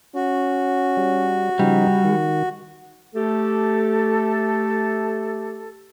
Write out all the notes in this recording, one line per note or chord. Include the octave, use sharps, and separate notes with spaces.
C#4 F#4
G3
C#3 F3 G3 D#4
D#3
A3 G4 A4